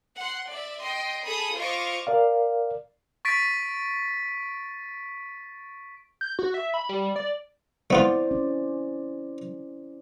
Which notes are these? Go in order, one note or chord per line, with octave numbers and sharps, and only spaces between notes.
F#5 C6
D5 E5
D#5 G5 C6
G#4 A4 B5 D#6
F4 C5 D#5 F5 C#6 D6
A#4 D5 F5
C#6 A6 B6 D7
G6
F#4
E5
B5
G3
D5
A3 B3 E4 F4 C5 D5
C#4